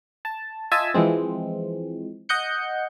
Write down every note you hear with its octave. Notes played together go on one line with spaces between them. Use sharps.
A5
F4 D#5 E5 G#5 A5 E6
E3 F3 G#3 C4
D#5 F#5 G6 C#7